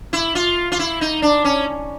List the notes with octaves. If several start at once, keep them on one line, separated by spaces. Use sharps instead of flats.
E4
F4
F4
E4
D#4
D4
C#4